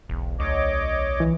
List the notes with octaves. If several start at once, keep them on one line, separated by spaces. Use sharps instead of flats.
E1 B1
D2 C#5 D#5 D6
E3